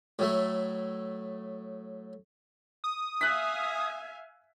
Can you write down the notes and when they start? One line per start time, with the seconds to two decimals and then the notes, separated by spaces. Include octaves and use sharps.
0.19 A2 F#3 A3
2.84 D#6
3.21 E5 F5 G#5 F#6 B6